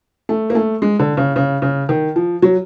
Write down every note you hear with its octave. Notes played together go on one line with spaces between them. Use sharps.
A3
A#3
A3
G#3
D3
C#3
C#3
C#3
D#3
F3
F#3